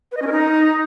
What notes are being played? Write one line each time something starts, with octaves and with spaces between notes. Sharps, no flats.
B4
D#5
C#4
A#4
D#4